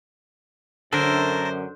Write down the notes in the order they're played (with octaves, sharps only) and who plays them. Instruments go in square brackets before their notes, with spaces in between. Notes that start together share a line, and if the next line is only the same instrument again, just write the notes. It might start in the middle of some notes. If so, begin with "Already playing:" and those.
[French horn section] F#2 [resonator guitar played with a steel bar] D3 [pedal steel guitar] A4 A#4 [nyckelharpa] C5